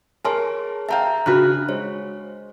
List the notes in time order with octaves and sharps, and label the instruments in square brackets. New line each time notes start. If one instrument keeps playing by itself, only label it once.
[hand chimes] G#4 C#5 G#5 [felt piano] A#4 A5 C6
[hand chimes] E5 A#5 G6 [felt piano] F5 G5 A5
[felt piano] C#3 [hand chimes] D4 F6 F#6 [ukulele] F4 F#4 B4
[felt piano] G#3 [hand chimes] C5 C#5